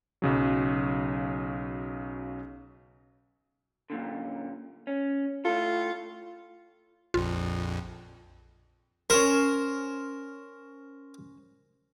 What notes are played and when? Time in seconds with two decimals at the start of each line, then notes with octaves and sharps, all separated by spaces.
0.22 B1 C#3 F#3
3.90 F#2 A#2 D3
4.87 C#4
5.45 A2 F4 A4
7.14 A#1 F2 F4
9.10 C#4 A#4 C5